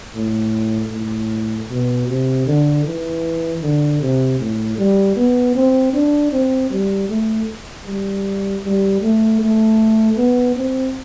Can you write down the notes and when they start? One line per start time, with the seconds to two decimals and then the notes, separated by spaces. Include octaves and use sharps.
0.14 A2
0.91 A2
1.69 B2
2.08 C3
2.46 D3
2.85 E3
3.62 D3
4.01 C3
4.39 A2
4.78 G3
5.16 B3
5.55 C4
5.93 D4
6.32 C4
6.70 G3
7.09 A3
7.86 G3
8.64 G3
9.02 A3
9.40 A3
10.17 B3
10.56 C4